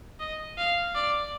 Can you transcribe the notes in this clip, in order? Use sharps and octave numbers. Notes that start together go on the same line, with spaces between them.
D#5
F5
D5